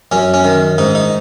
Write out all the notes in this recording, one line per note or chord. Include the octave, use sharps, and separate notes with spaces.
F#2 C#4
C#4
D#3
G#2 D#4
D#4